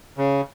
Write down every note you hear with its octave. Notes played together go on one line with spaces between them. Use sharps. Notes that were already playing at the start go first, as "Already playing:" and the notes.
C#3